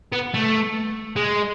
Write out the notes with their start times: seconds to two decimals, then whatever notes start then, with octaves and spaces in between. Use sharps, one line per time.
0.12 B3
0.34 A3
1.16 G#3